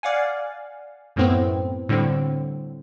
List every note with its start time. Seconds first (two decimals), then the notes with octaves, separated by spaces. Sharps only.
0.03 D5 F5 F#5 G#5
1.16 F#2 A2 A3 B3 C4
1.89 A2 D3 G3 C4